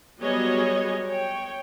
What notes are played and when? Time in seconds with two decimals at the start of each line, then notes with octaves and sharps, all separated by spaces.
0.21 F#3 G3 B3 G#4 C#5 D#5
1.08 C#5 G5